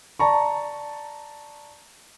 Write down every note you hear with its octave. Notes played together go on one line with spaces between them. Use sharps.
D5 A5 A#5 C#6